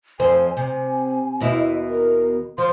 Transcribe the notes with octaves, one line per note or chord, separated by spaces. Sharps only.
F2 C5 G#5
C3 G#5
D#2 B2 E4
A#4
F3 C6